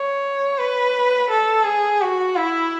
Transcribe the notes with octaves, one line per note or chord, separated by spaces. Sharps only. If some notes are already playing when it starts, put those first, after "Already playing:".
Already playing: C#5
B4
A4
G#4
F#4
E4